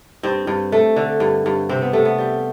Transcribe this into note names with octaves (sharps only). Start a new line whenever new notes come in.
G2 C4
G2
A3
D3
G2
G2
C3 C4
B3
C3 A3
B3
G3